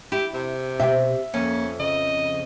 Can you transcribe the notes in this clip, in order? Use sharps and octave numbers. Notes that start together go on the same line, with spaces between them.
E4 G4
C3
B2 C4 G4 E5
F2 A#3 C#4
C#3 D#5